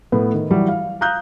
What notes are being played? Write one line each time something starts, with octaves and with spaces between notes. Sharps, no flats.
A2 B3 B4
D#3
E3 F#3 G3
F5
F5 A#5 D#6 F#6 G6